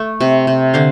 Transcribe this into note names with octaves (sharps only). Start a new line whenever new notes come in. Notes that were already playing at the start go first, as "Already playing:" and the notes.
Already playing: A3
C3
C3
D3 C5 F5